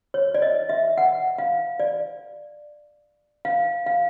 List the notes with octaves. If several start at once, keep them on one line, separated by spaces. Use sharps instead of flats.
C#5
D5
D#5
E5
F#5
F5
D5
F5
F5